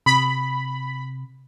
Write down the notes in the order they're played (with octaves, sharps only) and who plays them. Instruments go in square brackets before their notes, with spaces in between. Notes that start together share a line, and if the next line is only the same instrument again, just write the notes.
[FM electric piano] C3 [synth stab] B5